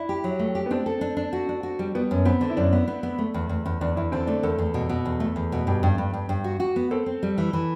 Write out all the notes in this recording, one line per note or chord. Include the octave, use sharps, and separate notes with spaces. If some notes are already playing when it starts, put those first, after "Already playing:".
Already playing: D4 E4
G4
F#3
A3
G4
B3
C4 D4
A4
D4
D4
F#4
D4
F#4
G3
G3 B3
F#2
B3 C4
D3
E4
F#2 D4
B3
B3
B3
A3
E2
E2
E2
E2 D4
E2 E4
D3 C4
A3 D4
E2 A4
E2
B2
B2
E2
A3
E2
B2
G2 G4
G2
G2
G2
G2
F#4
F#4
B3
C4 A4
C4
G3
E3
E3